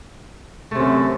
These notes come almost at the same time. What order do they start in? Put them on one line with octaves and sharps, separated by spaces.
A3 C3 F#2